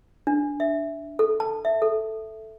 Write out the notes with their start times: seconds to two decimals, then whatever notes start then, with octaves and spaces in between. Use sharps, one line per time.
0.27 D4
0.60 E5
1.19 A4
1.40 A5
1.65 E5
1.82 A4